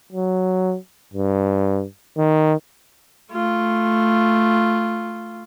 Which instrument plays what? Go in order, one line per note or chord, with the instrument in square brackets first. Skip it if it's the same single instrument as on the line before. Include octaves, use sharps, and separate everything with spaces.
[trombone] F#3
G2
D#3
[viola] A3 F4